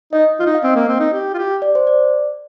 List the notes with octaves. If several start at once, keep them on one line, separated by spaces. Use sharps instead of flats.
D#4 D#5
F4
D#4
F5
C4 D#5
A#3
C4
D#4
G4
F4
G4
D5
C5
D5